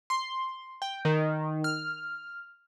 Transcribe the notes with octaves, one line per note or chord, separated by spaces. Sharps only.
C6
G5
D#3
F6